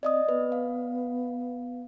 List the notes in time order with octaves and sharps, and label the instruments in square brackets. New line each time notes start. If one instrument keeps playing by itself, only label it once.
[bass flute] C4 [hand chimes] D5 D#5 D#6
[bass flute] B3 [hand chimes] B4
[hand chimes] F5